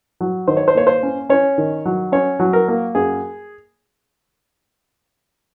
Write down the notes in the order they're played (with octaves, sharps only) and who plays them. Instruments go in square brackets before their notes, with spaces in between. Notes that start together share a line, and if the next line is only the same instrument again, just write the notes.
[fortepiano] F#3
D#3 C5
C#5
C5
A#3 C#5
C5
C#4
C#4 C#5
D#3
F#3
C#4 C#5
F#3
A#4
A#3
F#2 G#4